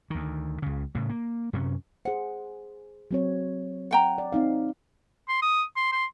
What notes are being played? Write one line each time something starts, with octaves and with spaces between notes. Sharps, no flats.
D2 D#3
C#2 C#3
A2 C#3
A#3
F#2 C3 C#4
G#4 C5 F#5
F#3 C4 C#5
F#5 G5 A#5
D5
C4 D#4 F5
C6
D#6
C6
C6